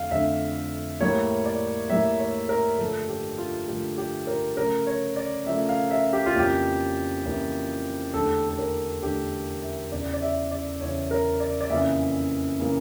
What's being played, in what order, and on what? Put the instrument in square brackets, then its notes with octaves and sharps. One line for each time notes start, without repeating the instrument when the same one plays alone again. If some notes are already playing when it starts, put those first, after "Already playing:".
Already playing: [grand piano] F2 D3 A3 F5
F2 D3 A3 E5
A2 G3 A#3 C#5
D5
A2 G3 A#3 E5
C#5
A#4
G2 D3 F3 A3 A4
G4
F4
G2 D3 F3 A3 G4
G4
A#4
C#3 F3 A3 A#4
C#5
D5
C#3 F3 A3 E5
F5
E5
G4
F4
F2 C#3 E3 A#3 G4
F2 C#3 E3 A#3
E2 D3 A3 A4
A4
A#4
E2 D3 A3 G4
E5
E2 C#3 E3 D5
D5
E5
D5
E2 C#3 E3 C#5
A#4
D5
D5
F2 C#3 E3 A#3 E5
C#3 E3 A#3